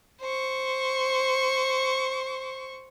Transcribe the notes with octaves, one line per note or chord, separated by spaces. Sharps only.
C5 C#6